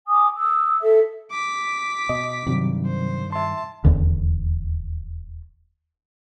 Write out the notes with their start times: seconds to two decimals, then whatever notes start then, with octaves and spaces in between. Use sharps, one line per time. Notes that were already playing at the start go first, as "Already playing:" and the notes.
0.08 G#5 D6 D#6
0.37 D#6 E6
0.81 A4 E5
1.31 D6 B6
2.09 B2 D#5
2.47 G2 C3 D#3 F#3
2.86 C5
3.32 E5 A5 C6
3.85 D#1 E2 D3